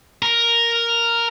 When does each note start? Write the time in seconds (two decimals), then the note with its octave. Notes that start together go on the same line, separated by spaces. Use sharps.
0.22 A#4